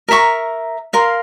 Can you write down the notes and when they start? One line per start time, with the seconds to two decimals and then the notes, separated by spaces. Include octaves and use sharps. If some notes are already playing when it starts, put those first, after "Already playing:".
0.08 A#4 E5 A#5 C#6
0.93 A#4 F5 C6